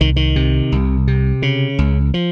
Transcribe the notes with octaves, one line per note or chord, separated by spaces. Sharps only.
C2 D#3
D#3
C3
C2
C3
C#3
C#2
F3